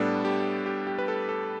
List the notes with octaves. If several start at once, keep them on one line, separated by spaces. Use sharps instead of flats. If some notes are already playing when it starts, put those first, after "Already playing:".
Already playing: A2 G3 B3 D4 A4
G4
G4
G4
B4
A4
A4